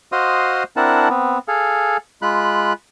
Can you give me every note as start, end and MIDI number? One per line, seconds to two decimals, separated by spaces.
0.12 0.63 66
0.12 0.63 72
0.12 0.63 75
0.12 0.63 77
0.12 0.63 84
0.12 0.63 87
0.77 1.09 60
0.77 1.09 62
0.77 1.09 64
0.77 1.09 70
0.77 1.09 78
0.77 1.09 81
1.09 1.38 59
1.09 1.38 60
1.48 1.97 68
1.48 1.97 69
1.48 1.97 77
2.22 2.73 56
2.22 2.73 65
2.22 2.73 83
2.22 2.73 90